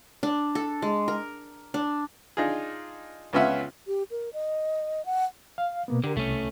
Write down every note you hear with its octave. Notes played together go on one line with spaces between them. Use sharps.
D4
A4
G#3
A#4
D4
D4 D#4 F4 G#4
C#2 B3 C#4 F4 E5 F#5
G4
A#4
D#5
F#5
F5
B2 A#3 B3
D3 G4 A#4
C2 A3 C#4